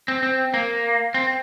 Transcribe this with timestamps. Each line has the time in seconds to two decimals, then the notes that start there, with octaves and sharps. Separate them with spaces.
0.08 C4
0.23 C4
0.54 A#3
1.14 C4